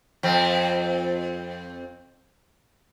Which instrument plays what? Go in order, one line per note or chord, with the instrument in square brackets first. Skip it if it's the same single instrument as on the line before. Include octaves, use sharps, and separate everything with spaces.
[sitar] F2 C4